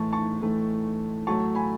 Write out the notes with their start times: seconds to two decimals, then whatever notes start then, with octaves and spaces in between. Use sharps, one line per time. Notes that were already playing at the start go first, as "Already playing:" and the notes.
Already playing: A2 E3 A3 A5 C#6
0.13 A5 C#6
0.41 A2 E3 A3
1.27 A2 F#3 A3 A5 C#6
1.55 G#5 B5